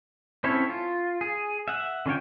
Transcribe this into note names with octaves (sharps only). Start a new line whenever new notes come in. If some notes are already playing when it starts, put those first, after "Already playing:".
C4 C#4 E4 A4 C#5
F4
G#4
E5 F#5
D3 C#4 F4 C#5 G5